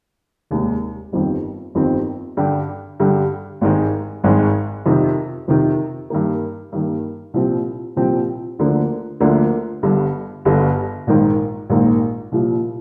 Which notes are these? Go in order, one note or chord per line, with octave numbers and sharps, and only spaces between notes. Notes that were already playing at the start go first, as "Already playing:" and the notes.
F1 D#2 D#3 G#3 D#4
G1 F2 D#3 G3 C4
G1 F2 D#3 G3 C4
G2 D3 G3 D4 G4
G2 D3 G3 D4 G4
G#1 G#2 D#3 G#3
G#1 G#2 D#3 G#3
F2 C3 D#3
F2 C3 D#3
G2 D#3 A#3
G2 D#3 A#3
C2 A#2 F3 C4 G4
C2 A#2 F3 C4 G4
D2 D3 F3 A#3 D4
D2 D3 F3 A#3 D4
G1 G2 D3
G1 G2 D3
A#1 G#2 D#3 A#3
A#1 G#2 D#3 A#3
C2 A#2 F3